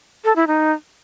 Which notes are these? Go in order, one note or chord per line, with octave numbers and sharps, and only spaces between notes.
A4
E4
D#4